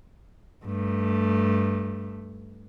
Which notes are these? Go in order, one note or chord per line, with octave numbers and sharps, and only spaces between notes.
G2 A3